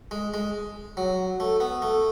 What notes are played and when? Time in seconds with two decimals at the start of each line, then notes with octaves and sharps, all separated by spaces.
0.11 G#3
0.34 G#3
0.97 F#3
1.40 A3
1.60 B3
1.82 A3